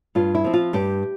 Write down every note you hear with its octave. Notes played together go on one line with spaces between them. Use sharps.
G2 F4
E4
F3 C4
F4
G2 G4